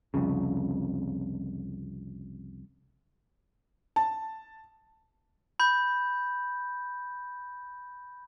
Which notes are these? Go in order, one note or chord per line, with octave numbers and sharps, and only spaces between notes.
C2 F2 C#3
A5
B5 G6